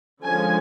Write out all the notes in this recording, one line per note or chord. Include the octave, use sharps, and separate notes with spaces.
D3 F3 G#3 C#4 G#5